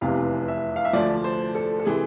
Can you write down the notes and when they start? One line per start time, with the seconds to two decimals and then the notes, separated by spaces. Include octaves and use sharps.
0.01 F1 E2 C3 E3 F5
0.48 E5
0.76 F5
0.85 E5
0.93 D2 D3 F3 D5
1.24 C5
1.55 A4
1.80 A4
1.85 C3 E3 G#3 G#4